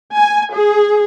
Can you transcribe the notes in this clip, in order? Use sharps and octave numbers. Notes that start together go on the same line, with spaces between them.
G#5
G#4